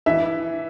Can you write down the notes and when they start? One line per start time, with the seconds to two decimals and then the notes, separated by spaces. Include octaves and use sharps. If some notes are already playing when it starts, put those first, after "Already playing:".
0.06 E3 E5